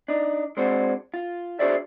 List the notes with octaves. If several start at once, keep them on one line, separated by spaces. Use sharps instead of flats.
D4 D#4
G#3 C4 D4 F#4
F4
D4 F#4 G#4 C5 D5 E5